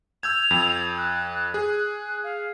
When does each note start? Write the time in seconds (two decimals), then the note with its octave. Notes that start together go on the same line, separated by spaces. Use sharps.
0.23 E6 G6 G#6 F7
0.51 F2
0.98 F#6
1.54 G#4 F#6
2.24 F5